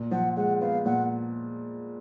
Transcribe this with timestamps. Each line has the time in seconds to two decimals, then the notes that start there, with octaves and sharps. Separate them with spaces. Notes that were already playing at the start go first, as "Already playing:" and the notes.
Already playing: A#2
0.11 F3 F#5
0.36 G#3 F#5
0.61 B3 F5
0.86 A#2 F#5